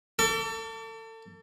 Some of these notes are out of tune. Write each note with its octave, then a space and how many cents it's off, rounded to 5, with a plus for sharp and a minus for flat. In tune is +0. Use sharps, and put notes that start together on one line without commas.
A4 +30 D6 -40